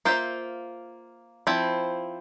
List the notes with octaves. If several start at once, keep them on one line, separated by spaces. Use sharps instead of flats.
A#3 F4 C5 E5
F3 C4 E4